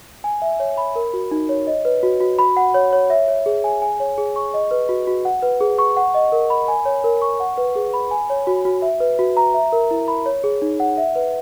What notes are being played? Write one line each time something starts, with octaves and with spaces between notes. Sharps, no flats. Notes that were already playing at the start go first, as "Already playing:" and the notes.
G#5
E5
C#5
B5
A#4
F#4
D#4
C#5
D#5
B4
F#4
F#4
B5
F#5
C#5
C#5
E5
C#5
G#4
G#5
G#5
C#5
G#4
C#6
D#5
B4
F#4
F#4
F#5
B4
G#4
C#6
F#5
D#5
A#4
B5
G#5
C#5
A#4
C#6
F#5
B4
G#4
B5
G#5
C#5
F#4
F#4
E5
B4
F#4
A#5
E5
A#4
E4
B5
C#5
G#4
D#4
F#5
E5
B4